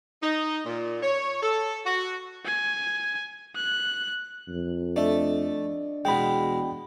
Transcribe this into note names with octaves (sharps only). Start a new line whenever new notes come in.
D#4
A#2
C#5
A4
F#4
G#5
F#6
F2
A3 D4 D5 D#5
E2 B2 G#3 G5 B5